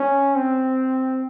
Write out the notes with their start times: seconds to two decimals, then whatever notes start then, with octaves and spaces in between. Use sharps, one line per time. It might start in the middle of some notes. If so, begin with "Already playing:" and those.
Already playing: C#4
0.35 C4